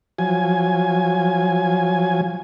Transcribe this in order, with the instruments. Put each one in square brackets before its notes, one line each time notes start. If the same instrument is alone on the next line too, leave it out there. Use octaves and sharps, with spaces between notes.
[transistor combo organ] F3 F#3 G#5